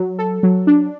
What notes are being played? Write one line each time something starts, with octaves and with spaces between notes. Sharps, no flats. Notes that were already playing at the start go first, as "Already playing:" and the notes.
Already playing: F#3
A4
F#3
D4